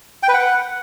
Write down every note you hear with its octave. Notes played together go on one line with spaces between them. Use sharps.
G5
B4
F#5